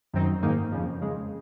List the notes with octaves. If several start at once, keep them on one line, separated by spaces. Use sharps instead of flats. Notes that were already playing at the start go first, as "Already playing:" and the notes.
F#2 D#3 F#3 C4 D#4
G#2 D#3 A#3 D#4
F2 C#3 F3
F2 C#3 G#3